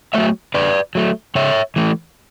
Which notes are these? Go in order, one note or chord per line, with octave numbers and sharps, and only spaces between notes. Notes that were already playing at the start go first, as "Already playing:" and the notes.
F#3 A3 C#5 E5
D3 B4 D5
F#3 A3
C#3 C#5 E5
E3 A3